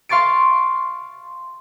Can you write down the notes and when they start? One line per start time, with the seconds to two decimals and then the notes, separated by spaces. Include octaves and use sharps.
0.09 F5 C6 C#6 A6 D7